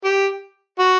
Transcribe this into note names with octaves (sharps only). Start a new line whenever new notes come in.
G4
F#4